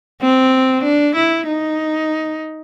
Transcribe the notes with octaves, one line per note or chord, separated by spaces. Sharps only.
C4
D4
E4
D#4